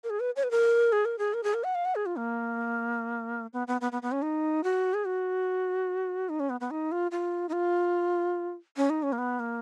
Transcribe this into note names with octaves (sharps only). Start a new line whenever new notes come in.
A#4
G#4
B4
C#5
B4
A#4
G#4
A#4
G#4
A#4
G#4
A#4
F#5
F5
F#5
G#4
F4
A#3
B3
B3
B3
B3
B3
C#4
D#4
F#4
G#4
F#4
D#4
C#4
B3
B3
D#4
F4
F4
D#4
F4
C#4
D#4
C#4
A#3
B3
A#3